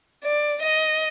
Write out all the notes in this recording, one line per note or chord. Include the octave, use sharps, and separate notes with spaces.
D5
D#5